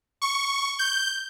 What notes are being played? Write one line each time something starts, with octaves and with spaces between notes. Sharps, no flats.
C#6
G6